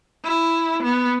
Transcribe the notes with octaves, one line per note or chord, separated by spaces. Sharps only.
E4
B3